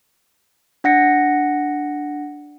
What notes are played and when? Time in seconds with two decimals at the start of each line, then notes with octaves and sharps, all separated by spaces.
0.84 D4 F#5 A#6 C#7